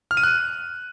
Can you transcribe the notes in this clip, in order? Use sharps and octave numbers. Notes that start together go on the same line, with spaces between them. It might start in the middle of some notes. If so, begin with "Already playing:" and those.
F6
D#7
F#6